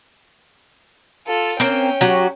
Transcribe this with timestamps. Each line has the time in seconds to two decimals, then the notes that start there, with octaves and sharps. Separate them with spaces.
1.27 F4 A4
1.60 A#3 C4 C#4 G5
2.01 F#3 F#4 G4